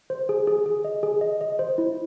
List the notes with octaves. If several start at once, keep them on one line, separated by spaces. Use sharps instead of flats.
C5
G#4
G#4
G#4
D#5
G#4
D#5
D#5
C5
E4